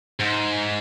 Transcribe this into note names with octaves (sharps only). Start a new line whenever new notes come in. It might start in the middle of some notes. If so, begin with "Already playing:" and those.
G#2